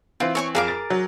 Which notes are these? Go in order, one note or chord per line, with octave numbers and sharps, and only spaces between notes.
E3 C4 F4
C#5 G#5 C#6
F2 G#4 A#4 F5 D6
A6
F#3